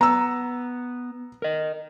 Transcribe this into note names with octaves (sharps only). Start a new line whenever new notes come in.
B3 A#5 E6
A#4 D#5